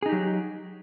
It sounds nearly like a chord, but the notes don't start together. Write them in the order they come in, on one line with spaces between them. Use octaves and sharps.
G#4 D#4 G4 F#3